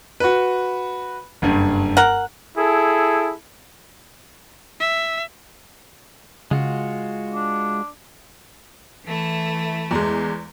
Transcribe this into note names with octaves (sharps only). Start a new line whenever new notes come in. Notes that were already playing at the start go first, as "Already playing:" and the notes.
F#4 B4
F#1 G2
A#4 F#5
E4 G#4 A4
E5
C#3 G#3 F4 F#4
D4
E3 A3 E4
E2 G#3